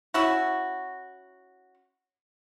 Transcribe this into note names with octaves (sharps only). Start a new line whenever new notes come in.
C#4 E4 F#4